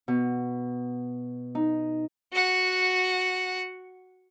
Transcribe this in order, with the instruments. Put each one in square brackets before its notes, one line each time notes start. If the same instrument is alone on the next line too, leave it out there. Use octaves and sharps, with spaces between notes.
[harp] B2
D#4
[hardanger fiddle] F#4 F#5